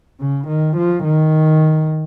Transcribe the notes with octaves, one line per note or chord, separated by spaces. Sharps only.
C#3
D#3
F3
D#3